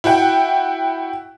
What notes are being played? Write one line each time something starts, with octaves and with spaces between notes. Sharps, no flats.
E4 F#4 F#5 G5